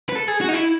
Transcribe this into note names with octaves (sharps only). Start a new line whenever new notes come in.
B4
A4
G#4
F#4
D#4
E4